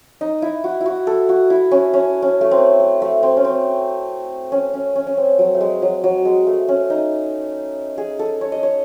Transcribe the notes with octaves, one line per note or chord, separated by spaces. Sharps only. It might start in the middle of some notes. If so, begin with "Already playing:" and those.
D#4
E4
F#4
E4
F#4
A4
F#4
E4
C#4
C#4
C#4
A3
C4
A3
A3
C4
C#4
C4
C#4
C#4
C#4
C#4
C4
F#3
A3
G#3
F#3
F#3
G#3
A3
C#4
D#4
G#4
A4
C#5
D#5
C#5